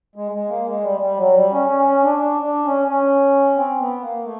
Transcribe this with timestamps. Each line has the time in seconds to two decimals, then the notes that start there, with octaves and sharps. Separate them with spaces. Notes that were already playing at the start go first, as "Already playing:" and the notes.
0.15 G#3
0.32 G#3
0.48 A#3
0.66 G#3
0.83 G3
1.00 G3
1.17 F#3
1.34 G3
1.52 C#4
1.68 C#4
1.85 C#4
2.03 D4
2.19 D4
2.42 D4
2.65 C#4
2.87 C#4
3.56 C4
3.79 B3
4.01 A#3
4.24 A3